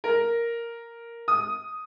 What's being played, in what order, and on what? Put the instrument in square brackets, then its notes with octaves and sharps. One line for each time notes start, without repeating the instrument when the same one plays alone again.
[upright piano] A#4
D#6